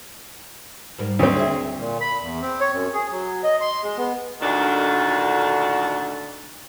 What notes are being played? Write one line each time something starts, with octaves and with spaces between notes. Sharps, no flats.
G#2 G3 A#3
D2 C4
G#4 E5
A#2
B5
E2
C4
C#5
F#2
G#4
F#3
D#5
C6
G#3
B3
D2 A#2 D3 D#3 D4 F#4